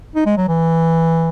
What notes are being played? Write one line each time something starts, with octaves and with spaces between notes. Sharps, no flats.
D#4
G#3
F#3
E3